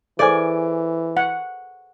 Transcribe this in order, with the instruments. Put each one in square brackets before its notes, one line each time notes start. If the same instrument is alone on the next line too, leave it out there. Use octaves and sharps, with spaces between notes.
[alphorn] E3 [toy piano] G#4 A4 C5 [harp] D5 G#5
[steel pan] F#5